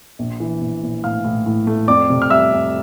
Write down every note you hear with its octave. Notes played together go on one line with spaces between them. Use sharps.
A#1
E3
A#1
A#1
A2 F5 F6
A2
A2
A3
F2 D5 D6
C3
F6
G3 E5 E6
F2